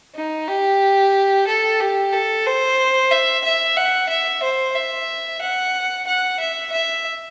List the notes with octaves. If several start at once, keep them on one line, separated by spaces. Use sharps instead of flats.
D#4
G4
A4
G4
A4
C5
E5
E5
F#5
E5
C5
E5
F#5
F#5
E5
E5